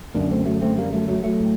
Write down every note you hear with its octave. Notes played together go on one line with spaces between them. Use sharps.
F#2 D3 A#3 D4
A3 C4
F#3 A3
A3 C4
G3 A#3
F#3 A3
F#3 A3
F#3 A3
A2